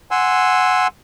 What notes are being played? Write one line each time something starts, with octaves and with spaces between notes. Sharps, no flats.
F#5 G#5 C6 E6